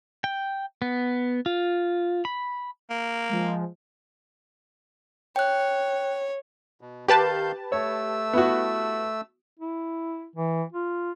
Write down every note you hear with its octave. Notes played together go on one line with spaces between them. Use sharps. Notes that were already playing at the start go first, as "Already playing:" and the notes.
G5
B3
F4
B5
A#3
F3 G#3
C#5 G5 F#6
B2
D#3 G4 B4 F5 A5 G6
A3 C#5 E6
B3 E4 F#4
E4
E3
F4